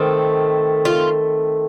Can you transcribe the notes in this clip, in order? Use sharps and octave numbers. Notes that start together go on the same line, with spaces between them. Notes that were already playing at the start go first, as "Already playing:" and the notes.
Already playing: D#3 A3 C4
F4